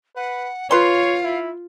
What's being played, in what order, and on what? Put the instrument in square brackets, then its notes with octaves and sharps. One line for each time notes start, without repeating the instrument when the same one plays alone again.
[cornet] B4 [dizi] F#5
[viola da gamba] F4 [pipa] B4 C6 [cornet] C#5 [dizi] F5
[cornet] E4